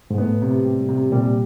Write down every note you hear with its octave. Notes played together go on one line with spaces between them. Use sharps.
G#2
A2 B3
C3
G3
C3
A#2 G3